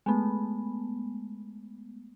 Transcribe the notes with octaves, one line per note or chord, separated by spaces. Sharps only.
G#3 A3 B3